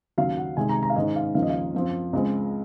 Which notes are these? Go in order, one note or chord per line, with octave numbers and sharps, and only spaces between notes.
D#2 C#3 F#3 F5
F#5
C2 C3 D#3 G#3 G#5
A#5
A#5
F5
G#2 D#3 G#3 C#4 D#5
F5
D#2 C#3 F3 A#3 C#4 F5
D#5
F5
F#2 F3 C4
C#2 C#3 G#3 C4